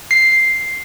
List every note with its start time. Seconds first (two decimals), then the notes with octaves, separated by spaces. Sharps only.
0.11 C7